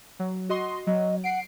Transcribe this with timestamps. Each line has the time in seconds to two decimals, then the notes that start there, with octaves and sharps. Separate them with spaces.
0.19 F#3
0.49 F#4 D#5 C6
0.87 F#3 D#5
1.24 F#5 C7 D7